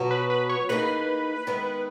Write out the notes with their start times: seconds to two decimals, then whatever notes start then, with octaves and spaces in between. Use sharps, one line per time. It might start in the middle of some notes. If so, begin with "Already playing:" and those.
Already playing: B2 F#3 B3 F#4
0.11 B4
0.30 B4
0.49 C#5
0.69 E3 A#3 D#4 G#4 B4
1.47 D#3 G#3 B3 E4 A#4